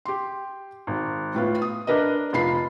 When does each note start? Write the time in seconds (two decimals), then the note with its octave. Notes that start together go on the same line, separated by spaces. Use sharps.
0.05 G4 C6
0.87 G#1
1.34 A2 B3 F4
1.62 D#6
1.87 D4 A#4 B4 D#5
2.33 F1 F4 B5 C7